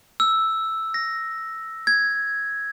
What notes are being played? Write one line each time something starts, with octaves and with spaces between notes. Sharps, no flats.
E6
A#6
G#6